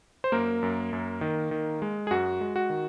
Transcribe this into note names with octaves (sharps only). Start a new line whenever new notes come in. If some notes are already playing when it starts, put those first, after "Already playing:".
C5
F#2 A#3 A#4
F#2
F#2
D#3
D#3
G#3
G#4
F#2 F#4
G#3
F#4
D#3